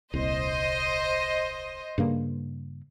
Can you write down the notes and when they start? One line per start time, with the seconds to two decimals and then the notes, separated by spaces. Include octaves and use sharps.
0.14 D#1 C2 C5 D#5
1.98 G2 C#3 A#3